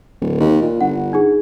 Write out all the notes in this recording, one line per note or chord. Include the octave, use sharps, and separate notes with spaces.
D1
D#2
A#2
G1 F#5
D#4 G#4